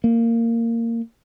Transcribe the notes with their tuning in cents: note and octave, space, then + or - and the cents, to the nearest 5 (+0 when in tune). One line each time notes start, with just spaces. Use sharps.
A#3 -15